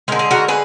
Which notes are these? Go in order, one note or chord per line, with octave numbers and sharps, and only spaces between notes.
D3 G#3 A#4
G#4
F#4 A#4
G#4 B4